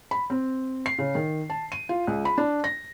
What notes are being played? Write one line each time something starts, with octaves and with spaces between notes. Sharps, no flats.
B5
C4
C7
C#3
D#3
A5
D#7
F4
C#2
B5
D4
A#6